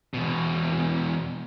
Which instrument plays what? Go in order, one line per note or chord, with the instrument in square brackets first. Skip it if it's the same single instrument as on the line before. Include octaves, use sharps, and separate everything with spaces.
[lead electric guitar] E2 B2